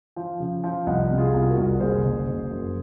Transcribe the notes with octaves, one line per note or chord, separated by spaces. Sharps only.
F3
C#3
F3
C2 D#5 F#5
C3
F4 G#4
C2
F#4 A#4
C2
F#1 G#4 C5
F#1
F#1
F#2